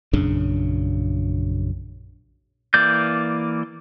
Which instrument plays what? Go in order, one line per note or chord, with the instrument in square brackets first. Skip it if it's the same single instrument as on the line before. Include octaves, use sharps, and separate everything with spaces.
[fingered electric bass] A#1 F#2 C#3 D4
[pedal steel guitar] E3 A#3 D5 G6